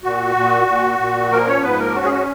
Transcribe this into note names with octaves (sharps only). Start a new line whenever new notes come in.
A#2 F#4
A#2
A#2
A#2
F3 A#3 A#4
C#4 C#5
G#2 B3 B4
A#3 A#4
C#4 F#4
G#4
F#4